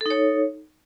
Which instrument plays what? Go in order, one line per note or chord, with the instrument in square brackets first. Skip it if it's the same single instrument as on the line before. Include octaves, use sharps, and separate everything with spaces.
[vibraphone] A4
D#4
C#5